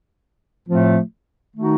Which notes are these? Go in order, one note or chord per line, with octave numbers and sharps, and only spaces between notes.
A2 F3 A3 C4 F4
D#3 A3 D#4 F#4